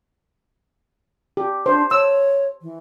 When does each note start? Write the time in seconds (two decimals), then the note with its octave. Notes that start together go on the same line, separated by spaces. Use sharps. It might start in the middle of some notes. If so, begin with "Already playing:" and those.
1.37 G4
1.66 D4 C5
1.91 C#5 E6
2.62 E3